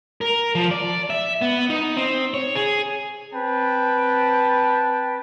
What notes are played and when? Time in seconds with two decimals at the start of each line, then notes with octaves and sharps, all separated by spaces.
0.21 A#4
0.55 F3
0.71 D5
1.10 E5
1.42 B3
1.70 D#4
1.97 C4
2.34 C#5
2.55 G#4
3.33 C4 B4 G5 A5